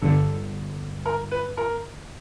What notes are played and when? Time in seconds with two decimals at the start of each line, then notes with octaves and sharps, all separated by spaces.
0.01 G1 G2 D3 A4
1.06 A#4
1.31 B4
1.57 A#4